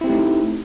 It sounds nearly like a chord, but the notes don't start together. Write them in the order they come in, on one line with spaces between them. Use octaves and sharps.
E4 C4 G4 A3 D#4